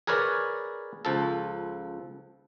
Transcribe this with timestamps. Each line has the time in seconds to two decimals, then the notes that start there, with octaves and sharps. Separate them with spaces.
0.07 G#4 A#4 B4 C#5 D5
1.05 C#2 F3 A4